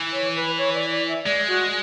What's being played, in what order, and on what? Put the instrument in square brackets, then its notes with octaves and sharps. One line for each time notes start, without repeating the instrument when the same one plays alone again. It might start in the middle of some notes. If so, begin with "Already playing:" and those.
Already playing: [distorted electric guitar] E3
[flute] C#5
B4
C#5
D5
D5
E5
[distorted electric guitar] G#3 [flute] D5
[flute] F#4